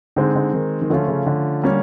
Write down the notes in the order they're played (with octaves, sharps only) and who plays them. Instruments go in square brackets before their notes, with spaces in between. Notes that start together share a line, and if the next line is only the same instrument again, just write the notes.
[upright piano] D3 [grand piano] G#3 C4 D#4
[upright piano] D3
D#3
D#3
[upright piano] D3 [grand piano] F3 A3 C#4 F4
[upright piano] C#3
D3
[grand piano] G3 A#3 C#4